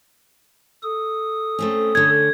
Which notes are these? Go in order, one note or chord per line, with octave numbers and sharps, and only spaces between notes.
A4 D#6
A3 C4 C#4
D3 C#4 G#6